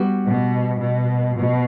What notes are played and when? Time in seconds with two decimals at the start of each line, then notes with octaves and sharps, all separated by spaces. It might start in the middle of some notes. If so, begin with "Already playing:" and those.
Already playing: G3 B3 F#4
0.27 B2
0.82 B2
1.37 B2